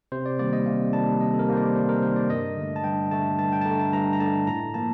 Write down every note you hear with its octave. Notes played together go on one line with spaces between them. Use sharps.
C3 C5
D5
D#3 G3 A#3 D5
D#5
C3 F5
D#3 G3 A#3 A5
C3 D#5
A4
A#4
D#3 G3 A#3 C5
D5
C3 C5
A#4
D#3 G3 A#3 C5
D5
G2 D#5
D3
A3
A5
G2 G5
D3 A3 A5
G2 A5
G5
A5
D3 A3 A#5
A5
G2 A#5
A#5
D3 A3 A5
A2 A#5
F3 A#3 A5